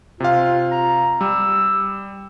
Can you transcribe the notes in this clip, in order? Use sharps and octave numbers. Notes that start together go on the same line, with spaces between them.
C3 F4 F5
A#5
G3 E6